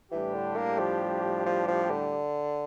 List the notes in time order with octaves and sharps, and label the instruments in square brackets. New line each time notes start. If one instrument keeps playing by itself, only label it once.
[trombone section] A2 G3 D4 G4 [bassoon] E3
[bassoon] D3
A#3
F3
F3
F3
D3